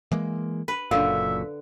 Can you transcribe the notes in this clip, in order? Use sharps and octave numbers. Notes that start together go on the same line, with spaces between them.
E3 G#3 A#3
B4
F#1 F#2 A#2 D3 E5 F5